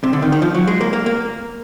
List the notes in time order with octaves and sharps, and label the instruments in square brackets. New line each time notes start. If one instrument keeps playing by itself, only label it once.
[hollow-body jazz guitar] C3
D3
D#3
D#3
F3
F#3
G#3
A#3
A#3
A#3